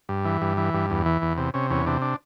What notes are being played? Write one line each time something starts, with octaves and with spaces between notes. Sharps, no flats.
G2
E3
G2
E3
G2
E2
E3
E2
C3
C3 C#4
E2 C#4
C3 D4
D4